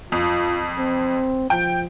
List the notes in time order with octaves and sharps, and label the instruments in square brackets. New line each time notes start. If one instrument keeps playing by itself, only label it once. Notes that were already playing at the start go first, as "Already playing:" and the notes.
[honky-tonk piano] F2 [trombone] F4
[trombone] C4
[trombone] F3 [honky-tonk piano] G5